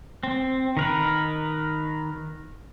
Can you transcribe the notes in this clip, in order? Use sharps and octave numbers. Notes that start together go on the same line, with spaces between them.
C4
D#3 A#4 B4